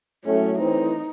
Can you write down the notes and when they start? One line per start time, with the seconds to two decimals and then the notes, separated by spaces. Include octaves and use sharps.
0.25 A2 F#3 A3 C#4
0.58 A2 E3 C4 D#4